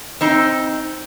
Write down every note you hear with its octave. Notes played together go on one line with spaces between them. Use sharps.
C4 D#4